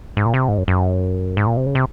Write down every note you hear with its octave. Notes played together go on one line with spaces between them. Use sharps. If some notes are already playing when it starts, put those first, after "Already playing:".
G#2
A#2
C3
G#2
F#2
F#2
G#2
A#2
C3
C#3
C3